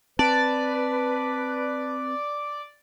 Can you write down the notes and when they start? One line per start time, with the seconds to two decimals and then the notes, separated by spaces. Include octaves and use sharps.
0.19 C4 B4 D5 A5